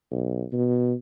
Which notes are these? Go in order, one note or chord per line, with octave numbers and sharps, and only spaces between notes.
B1
B2